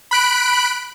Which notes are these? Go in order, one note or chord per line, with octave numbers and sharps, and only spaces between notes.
B5 F#6 D7